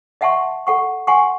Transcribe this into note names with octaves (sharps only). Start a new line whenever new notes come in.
D#5 E5 F#5 A5 C6 C#6
A4 F#5 C#6
F#5 G#5 C6 C#6